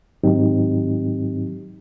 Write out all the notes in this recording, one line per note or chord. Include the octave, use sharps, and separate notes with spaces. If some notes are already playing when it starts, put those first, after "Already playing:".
G#2 D#3 F#3 C4 D#4 G4